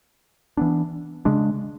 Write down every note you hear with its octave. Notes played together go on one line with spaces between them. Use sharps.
E3 B3 D4
C#3 G#3 D4